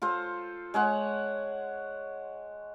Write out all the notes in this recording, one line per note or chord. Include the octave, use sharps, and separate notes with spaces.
F4 A4 C5 F5
G#3 C#5 F#5 C6